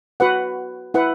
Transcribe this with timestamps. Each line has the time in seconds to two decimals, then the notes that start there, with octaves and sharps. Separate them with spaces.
0.20 F#4 B4 F#5
0.94 E4 B4 F#5